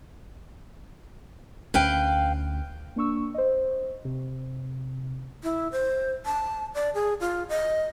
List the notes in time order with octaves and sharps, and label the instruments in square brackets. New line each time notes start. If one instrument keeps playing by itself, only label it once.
[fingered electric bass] D2 C#4 [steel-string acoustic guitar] B4 F5 G5
[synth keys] A#3 D4 C#6 E6
C5 D#5
C3
[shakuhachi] E4
C5
A5
D5
G#4
F4
D#5